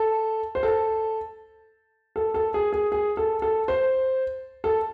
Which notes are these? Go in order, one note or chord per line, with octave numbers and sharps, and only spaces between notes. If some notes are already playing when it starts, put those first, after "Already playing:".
Already playing: A4
C5
A4
A4
A4
G#4
G#4
G#4
A4
A4
C5
A4